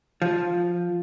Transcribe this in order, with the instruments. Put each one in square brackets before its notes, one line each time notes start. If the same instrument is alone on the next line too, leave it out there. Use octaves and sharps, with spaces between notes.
[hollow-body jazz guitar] F3